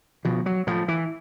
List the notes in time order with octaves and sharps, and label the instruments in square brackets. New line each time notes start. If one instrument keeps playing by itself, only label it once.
[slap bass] B2 F3
F#3
A2 F3
E3